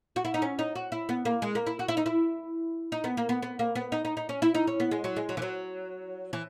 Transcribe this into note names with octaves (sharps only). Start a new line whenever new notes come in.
F#4
E4
D#4
C#4
D#4
F#4
E4
B3
A#3
G#3
A#3
E4
F#4
E4
D#4
E4
D#4
B3
A#3
B3
B3
A#3
B3
D#4
D#4
D#4
C#4
E4
D#4
C#4
B3
G#3
F#3
G#3
F#3
E3
F#3
E3